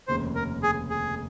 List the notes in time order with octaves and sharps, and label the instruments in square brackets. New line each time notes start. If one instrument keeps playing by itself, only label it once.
[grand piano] F1 D#2 C#3 [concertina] C5
[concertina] A#4
G#4
G#4